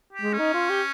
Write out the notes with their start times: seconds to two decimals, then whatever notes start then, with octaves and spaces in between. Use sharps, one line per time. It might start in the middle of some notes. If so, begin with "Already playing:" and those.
0.13 G4
0.22 G#3
0.33 C#4
0.39 D#4
0.54 F4
0.70 G4